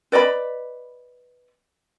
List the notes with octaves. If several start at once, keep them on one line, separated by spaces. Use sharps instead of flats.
B4 D5 D#5 B5